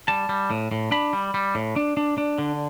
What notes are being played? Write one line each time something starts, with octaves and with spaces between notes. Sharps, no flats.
G3 A5
G3
A2
A2
D4 B5
G3
G3
A2
D4
D4
D4
D3